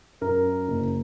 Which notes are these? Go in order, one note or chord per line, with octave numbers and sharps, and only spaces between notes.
F#2 A#4
F#1